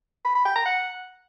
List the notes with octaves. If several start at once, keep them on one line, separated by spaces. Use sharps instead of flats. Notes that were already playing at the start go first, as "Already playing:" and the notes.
B5
B5
G5
A#5
F#5